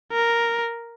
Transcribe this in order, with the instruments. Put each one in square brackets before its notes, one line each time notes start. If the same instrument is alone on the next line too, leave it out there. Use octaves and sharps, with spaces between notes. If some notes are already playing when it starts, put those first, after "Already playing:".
[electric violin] A#4